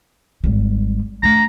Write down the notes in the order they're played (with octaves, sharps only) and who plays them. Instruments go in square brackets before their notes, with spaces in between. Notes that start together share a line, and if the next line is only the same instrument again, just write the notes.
[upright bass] G#1 G3
[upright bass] A3 D4 [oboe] A#5